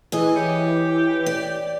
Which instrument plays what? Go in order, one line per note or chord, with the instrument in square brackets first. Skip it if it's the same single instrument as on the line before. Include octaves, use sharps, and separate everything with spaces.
[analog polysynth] E3 [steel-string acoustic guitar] G#4 D#5
[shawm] G4 [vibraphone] C#5
[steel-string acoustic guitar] D5